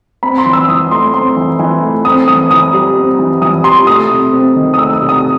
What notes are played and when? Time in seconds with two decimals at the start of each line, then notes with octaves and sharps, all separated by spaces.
0.23 C4 B5
0.38 C6
0.46 E3
0.53 E6
0.68 E3 D#6
0.91 A3 C6
1.14 C4 C6
1.37 E3
1.59 E3
1.82 A3
2.05 C4 D#6
2.28 E3 D#6
2.51 E3 D#6
2.73 G3
2.96 C4
3.19 E3
3.42 E3 D#6
3.64 G3 C6
3.87 A3 D#6
4.10 C3
4.33 C4
4.56 D#3
4.74 D#6
4.78 A3 E6
4.93 D#6
5.01 C3
5.09 D#6